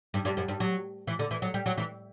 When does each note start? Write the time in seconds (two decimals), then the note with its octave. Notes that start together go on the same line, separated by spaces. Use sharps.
0.14 G2
0.25 G2
0.37 F#2
0.48 G2
0.60 F#3
1.07 E3
1.19 D3
1.31 E3
1.42 F#3
1.54 G3
1.66 F#3
1.77 E3